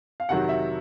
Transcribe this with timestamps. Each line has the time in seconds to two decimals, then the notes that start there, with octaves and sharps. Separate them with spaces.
0.20 F5
0.29 F2 C3 D#3 F#3 F#5
0.49 E5